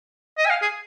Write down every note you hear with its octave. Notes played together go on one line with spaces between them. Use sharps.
D#5
G#5
F5
G#4